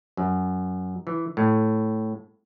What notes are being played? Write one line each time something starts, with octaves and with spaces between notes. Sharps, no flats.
F#2
E3
A2